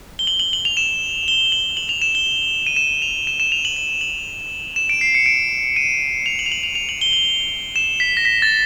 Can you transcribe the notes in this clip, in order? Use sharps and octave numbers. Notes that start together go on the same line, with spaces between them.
G7
F#7
F#7
F#7
F7
E7
G7
F#7
F#7
F7
E7
G7
D#7
E7
F7
E7
E7
F7
F#7
F#7
F#7
E7
D7
C7
C#7
D7
D#7
F7
F#7
F7
F#7
F7
F7
F#7
G7
F#7
E7
B6
A#6
B6
A6